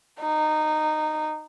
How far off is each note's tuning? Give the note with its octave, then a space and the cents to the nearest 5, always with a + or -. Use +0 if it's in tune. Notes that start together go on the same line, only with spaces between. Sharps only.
D#4 -15